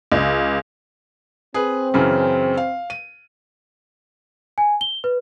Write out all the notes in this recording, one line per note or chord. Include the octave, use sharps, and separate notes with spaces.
C#2
C4 G#4 B4
F#2 C#3 E3
F5
D#7
G#5
G7
B4